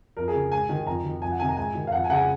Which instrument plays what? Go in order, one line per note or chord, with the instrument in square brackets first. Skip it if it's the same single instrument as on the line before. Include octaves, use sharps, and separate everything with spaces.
[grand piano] F2 A#4
G#4
C#3
G#2 G#5
D#3
F2 A#5
D#3
F2 G#5
F#5
C3 D#3 G#5
A#5
G#2 G#5
D#3
F5
F2 F#5
G#5
C#3 F#5
G#5